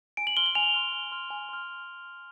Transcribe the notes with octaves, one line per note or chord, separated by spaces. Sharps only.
G#5 D7
F#7
C6 F6 G7
F#7
G#5 F7
C6 F6
G#5
C6 F6
G#5
C6 F6